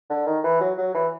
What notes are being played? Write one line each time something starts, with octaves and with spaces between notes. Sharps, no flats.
D3
D#3
E3
F#3
F#3
E3